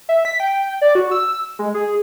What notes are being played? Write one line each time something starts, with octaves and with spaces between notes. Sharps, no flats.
E5
B6
G5
D5
F#4
E6
G#3
G#4